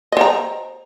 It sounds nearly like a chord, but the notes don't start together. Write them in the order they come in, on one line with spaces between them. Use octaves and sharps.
D#5 C5 A#5